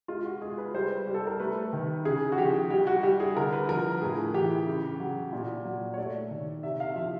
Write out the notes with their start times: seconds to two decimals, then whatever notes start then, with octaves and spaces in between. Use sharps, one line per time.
0.08 G#3 F4
0.25 F#4
0.42 G#3 G#4
0.58 B4
0.74 G3 C5
1.07 G3
1.14 A4
1.27 A#4
1.40 A3 B4
1.73 D#3
2.05 C#3 G#4
2.32 F#4
2.38 F3 G4
2.70 G3 G4
2.87 F#4
3.03 G3 G4
3.20 G#4
3.36 D3 A#4
3.53 B4
3.69 F3 A#4
4.01 A2 G#4
4.34 E3 G4
4.67 C#3
5.00 F#3
5.33 A#2
5.65 F#3
5.94 C#5
5.98 A3 D5
6.31 D#3
6.63 C3 E5
6.80 F5
6.96 F3 E5